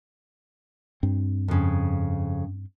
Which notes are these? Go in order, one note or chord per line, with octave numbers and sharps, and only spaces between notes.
G2 C4
F2 C#3